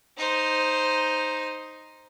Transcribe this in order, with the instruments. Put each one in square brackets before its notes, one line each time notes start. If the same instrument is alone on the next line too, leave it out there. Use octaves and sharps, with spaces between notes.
[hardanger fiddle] D#4 C5